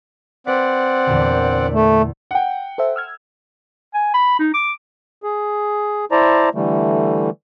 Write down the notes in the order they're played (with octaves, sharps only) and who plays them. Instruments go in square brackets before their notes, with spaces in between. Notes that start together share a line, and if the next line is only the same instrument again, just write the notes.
[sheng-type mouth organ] C4 D5 F#5 [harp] B4
[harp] E2 A#2 D3
[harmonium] A3
[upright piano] F#5 G5
[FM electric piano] A4 C5 E5
E6 F6 G#6
[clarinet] G#5
B5
D#4
D6
[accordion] G#4
E4 C5 D5 A5 A#5
D3 E3 G3 A3